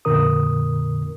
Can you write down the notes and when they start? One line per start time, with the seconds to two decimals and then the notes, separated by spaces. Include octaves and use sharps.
0.05 F2 A#2 D3 A#4 D#6